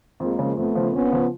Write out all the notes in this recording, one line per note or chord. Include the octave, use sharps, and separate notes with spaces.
F2 G#3 A#3
C#3 F3
F2 A3 B3
C#3 F3
F2 B3 C#4
C#3 F3